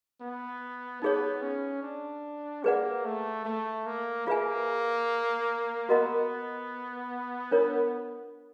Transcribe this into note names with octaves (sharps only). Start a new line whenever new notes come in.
B3
B3 D#4 G#4 C#5
C#4
D4
A#3 G#4 B4 D5 F#5
A3
A3
A#3
A#3 F4 G#4 B4 E5 G#5
B3 F#4 A#4 D#5 F#5 A#5
D4 F4 A#4 C#5